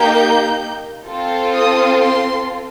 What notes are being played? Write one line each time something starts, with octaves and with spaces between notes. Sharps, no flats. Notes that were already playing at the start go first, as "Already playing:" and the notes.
Already playing: A#3 D#4 G4 G6
C4 F4 A4
D#6
C6